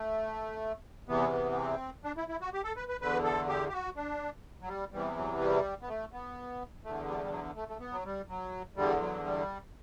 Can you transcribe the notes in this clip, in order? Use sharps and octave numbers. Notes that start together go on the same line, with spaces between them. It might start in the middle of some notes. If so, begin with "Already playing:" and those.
Already playing: A3
E2 C3 E3 B3
B3
B3
C4
D4
E4
E4
F#4
G4
A4
B4
B4
E2 D3 B4
A4
G4
G4
F#4
D4
F#3
G3
E2 C3 E3 G3
F#3
G3
B3
A3
B3
E2 D3 A3
G3
A3
G3
F#3
A3
A3
B3
F#3
G3
F#3
E2 D3 G3
F#3
G3